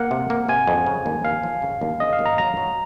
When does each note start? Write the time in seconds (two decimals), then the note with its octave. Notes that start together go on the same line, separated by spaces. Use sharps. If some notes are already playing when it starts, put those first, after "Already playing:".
Already playing: A#3 F#5
0.11 C3
0.30 A#3
0.49 C3 G#5
0.67 F2
0.87 C#3
1.06 D#2
1.25 D#2 F5
1.43 F3
1.62 C#3
1.81 D#2
2.00 C#3 D#5
2.13 F5
2.19 D#2
2.26 A#5
2.38 F#3 A#5
2.57 F#3